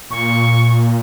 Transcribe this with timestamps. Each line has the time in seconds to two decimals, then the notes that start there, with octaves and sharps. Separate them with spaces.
0.11 A#2 C#6